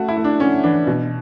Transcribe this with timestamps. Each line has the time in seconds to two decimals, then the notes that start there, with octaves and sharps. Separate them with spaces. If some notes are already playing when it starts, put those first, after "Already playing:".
Already playing: A3 C#4 F#4
0.08 E4
0.17 A3
0.24 D4
0.40 A3 C#4
0.63 E3 D4
0.87 B2